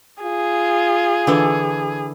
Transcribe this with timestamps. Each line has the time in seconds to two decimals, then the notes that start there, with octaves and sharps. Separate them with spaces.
0.23 F4 G#4
1.27 D3 E3 A4